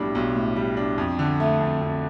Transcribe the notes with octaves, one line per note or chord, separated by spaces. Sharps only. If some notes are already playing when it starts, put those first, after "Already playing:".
Already playing: B1 A2 G3 D4
B1
A2
G3
D4
F2
D3
A3
F2
F2